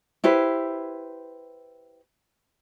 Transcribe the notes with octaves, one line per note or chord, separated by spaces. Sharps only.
E4 G4 B4 C5